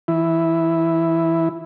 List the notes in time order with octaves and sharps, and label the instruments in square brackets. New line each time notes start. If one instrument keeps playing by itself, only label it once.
[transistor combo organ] E3 E4